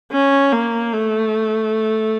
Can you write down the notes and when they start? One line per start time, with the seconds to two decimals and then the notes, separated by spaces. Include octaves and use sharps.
0.12 C#4
0.53 A#3
0.93 A3